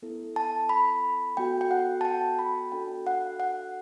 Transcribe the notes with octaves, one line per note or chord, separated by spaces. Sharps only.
B3 E4 A4
A5
B5
B3 F#4 A4 G5
G5
F#5
A5
G5
B5
D4 F#4 A4 G5
F#5
F#5